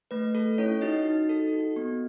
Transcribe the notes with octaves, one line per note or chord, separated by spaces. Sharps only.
A3 B4
A3 A4
C#4 E4 C#5
D#4 F#4 D#5
D#4
A4
F#4
B3